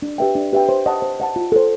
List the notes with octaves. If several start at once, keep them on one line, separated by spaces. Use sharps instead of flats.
D4
G4 B4 E5 G5
D4
G4 B4 E5 G5
C5
D#5 F#5 A5
C5
D#5 F#5 A5
F4
A4 C5